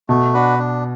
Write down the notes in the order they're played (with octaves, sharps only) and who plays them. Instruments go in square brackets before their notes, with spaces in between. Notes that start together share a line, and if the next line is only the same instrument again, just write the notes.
[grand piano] B2 [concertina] A3
[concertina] D4 F#4 B4
D4